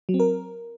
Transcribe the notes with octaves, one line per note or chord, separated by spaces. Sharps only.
F#3
C4
A#4